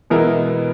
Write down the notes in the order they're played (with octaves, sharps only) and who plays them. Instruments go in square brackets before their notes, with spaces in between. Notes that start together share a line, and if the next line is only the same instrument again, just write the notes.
[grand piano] B2 G#3 B3 E4 A#4 [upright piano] E3